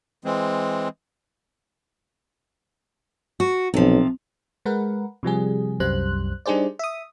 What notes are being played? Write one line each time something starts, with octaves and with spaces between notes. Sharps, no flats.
E3 G#3 C4
F#4
B1 C3 F3
G#3 A#4 B4 F#5
C3 F3 G3 G#4
C2 F#2 G3 C5 F#6
G3 D4 D#4 G#4 C5 D5
E5 D#6